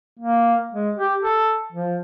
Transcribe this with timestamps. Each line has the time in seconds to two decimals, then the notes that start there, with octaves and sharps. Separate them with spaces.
0.20 A#3
0.73 G#3
0.97 G4
1.22 A4
1.72 F3